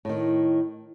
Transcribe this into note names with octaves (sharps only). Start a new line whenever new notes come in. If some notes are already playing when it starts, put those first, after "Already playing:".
A2 D#3